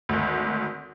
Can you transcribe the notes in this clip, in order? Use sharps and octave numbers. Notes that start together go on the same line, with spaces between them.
G#1 D2